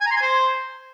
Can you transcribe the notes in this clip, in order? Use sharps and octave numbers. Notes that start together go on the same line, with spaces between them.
G#5
A#5
C6
G#5
C5